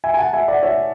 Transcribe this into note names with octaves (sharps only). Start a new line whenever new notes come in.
E5 G#5
G#5
F#5 A5
E5 G#5
D5 F#5
C#5 E5